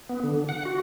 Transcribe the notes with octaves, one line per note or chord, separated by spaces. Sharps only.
B3
D3
F#5
F#4